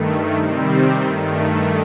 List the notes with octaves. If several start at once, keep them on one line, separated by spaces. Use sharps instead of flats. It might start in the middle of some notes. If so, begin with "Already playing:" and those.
Already playing: G2 D#3 A3
C3 D#3 G3 C4
G2 D#3 A3